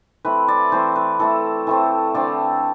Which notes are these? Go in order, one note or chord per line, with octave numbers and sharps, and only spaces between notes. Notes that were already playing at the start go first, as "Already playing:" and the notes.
E3 A3 C4 B4
D5
E3 A3 C4 C5
B4
E3 A3 C4 A4
E3 A3 C4
D3 A3 C4 D5